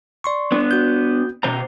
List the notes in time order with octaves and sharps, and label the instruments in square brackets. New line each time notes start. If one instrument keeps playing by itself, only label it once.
[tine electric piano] D5 C6 C#6
[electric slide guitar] B3 D4
[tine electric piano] F#4 G6
[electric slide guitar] B2 C5 A#5